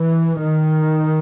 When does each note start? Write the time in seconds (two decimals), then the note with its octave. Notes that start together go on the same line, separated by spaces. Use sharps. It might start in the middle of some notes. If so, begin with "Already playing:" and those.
Already playing: E3
0.43 D#3